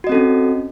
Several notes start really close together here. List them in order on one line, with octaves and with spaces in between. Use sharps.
F#4 D#5 C4 A4 C#4